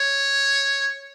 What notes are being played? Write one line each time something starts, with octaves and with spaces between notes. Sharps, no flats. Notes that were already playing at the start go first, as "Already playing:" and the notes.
Already playing: C#5